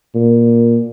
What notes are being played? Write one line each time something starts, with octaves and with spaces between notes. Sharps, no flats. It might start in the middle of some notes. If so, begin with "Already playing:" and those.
A#2